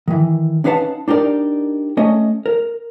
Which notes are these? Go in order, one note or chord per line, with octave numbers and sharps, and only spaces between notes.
D#3 E3
C#4 D#4 B4 F5 F#5 A5
D4 D#4 G4 A#4 D5
A3 C#4 D#5
A#4